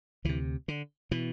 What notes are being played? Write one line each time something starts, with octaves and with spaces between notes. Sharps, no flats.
D2 C3 E3
D3
B2 E3